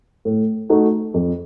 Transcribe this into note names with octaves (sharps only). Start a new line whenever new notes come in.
A2
A3 D#4 F#4
F2